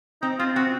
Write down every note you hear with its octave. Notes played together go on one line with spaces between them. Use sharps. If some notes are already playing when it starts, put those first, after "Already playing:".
C4 D#4
C4 F4
C4 F#4